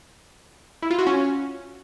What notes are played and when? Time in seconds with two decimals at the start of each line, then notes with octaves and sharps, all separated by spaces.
0.82 E4
0.90 F4
0.99 F#4
1.07 C#4